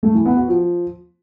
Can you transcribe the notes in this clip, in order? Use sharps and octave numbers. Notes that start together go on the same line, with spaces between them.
A3
E3
B3
F#4
F3